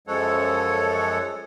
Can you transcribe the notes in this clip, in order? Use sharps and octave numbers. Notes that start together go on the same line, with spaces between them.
F#2 F3 G#3 A4 C#5 F#5